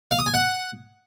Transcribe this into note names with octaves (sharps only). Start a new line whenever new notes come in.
F5
D#6
G#5
F#5